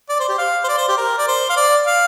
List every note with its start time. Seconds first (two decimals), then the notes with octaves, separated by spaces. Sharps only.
0.09 D5
0.20 C5
0.28 G4
0.38 F5
0.64 C5
0.68 D5
0.78 C5
0.88 G4
0.97 A#4
1.18 D5
1.28 C5
1.49 F5
1.57 D5
1.87 F5